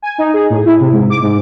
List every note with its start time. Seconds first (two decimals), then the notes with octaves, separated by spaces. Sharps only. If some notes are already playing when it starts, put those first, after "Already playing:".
0.02 G#5
0.18 D#4
0.34 G#4
0.50 A2
0.65 E4
0.80 C3
0.93 G#2
1.10 D6
1.22 G#2